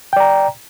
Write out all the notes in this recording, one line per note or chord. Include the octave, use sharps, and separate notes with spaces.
D5 G5 A#5